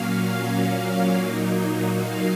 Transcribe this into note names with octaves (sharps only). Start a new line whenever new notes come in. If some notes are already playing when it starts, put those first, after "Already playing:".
Already playing: A#2 F#3 A#3 C#4 F5
A#2 F#3 A#3 D#4
F5